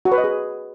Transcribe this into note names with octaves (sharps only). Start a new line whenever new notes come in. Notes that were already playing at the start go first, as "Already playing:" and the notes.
F#4
B4
D#5
G#4